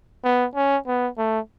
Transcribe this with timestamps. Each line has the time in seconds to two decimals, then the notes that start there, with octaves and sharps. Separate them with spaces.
0.24 B3
0.55 C#4
0.87 B3
1.18 A3